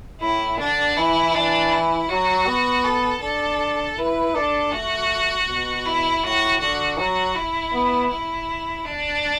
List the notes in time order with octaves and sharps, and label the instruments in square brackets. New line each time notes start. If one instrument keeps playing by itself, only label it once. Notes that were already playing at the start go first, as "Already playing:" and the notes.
[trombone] A2 [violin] E4
[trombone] D3 [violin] D4
[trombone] E3 [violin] E4
[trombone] E3 [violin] D4
[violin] E4
[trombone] F#3 [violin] F#4
[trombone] B3
[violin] A4
[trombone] D4 [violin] A4
[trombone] E4 [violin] B4
[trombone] D4 [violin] A4
[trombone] A3 [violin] F#4
[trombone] B2
[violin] E4
[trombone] A2 [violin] F#4
[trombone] D3 [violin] F#4
[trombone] F#3 [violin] F#4
[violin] E4
[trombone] B3
[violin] E4
D4